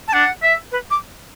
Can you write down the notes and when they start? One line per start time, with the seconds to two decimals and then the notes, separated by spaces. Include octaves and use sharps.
0.08 A5
0.13 D4 F#5
0.43 E5
0.72 B4
0.91 D6